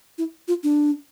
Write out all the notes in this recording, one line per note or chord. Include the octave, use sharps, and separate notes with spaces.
E4
F4
D4